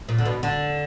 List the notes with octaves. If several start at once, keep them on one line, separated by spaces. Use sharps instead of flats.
A#2
D3
B2
D3